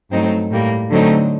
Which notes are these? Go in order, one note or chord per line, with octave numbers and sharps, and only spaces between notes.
G2 F#3 A3 C4 D#4
A2 G3 A#3
D3 F#3 A3 C4 D#4